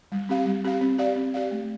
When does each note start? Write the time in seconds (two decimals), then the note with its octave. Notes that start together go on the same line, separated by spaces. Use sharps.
0.12 G3
0.29 C4 G4 F5
0.46 G3
0.64 C4 G4 F5
0.81 C4
0.98 G4 D5 F5
1.16 C4
1.34 G4 D5 F5
1.51 A3